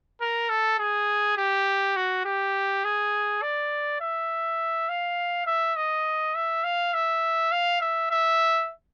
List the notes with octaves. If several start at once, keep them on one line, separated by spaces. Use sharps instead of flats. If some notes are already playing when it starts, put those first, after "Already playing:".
A#4
A4
G#4
G4
F#4
G4
G#4
D5
E5
F5
E5
D#5
E5
F5
E5
F5
E5
E5